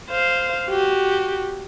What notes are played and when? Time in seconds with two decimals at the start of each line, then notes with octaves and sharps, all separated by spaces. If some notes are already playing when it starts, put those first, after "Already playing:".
0.11 C5 F5
0.70 F#4 G4